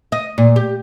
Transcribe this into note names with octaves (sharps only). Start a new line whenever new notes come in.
D#5
A#2
G4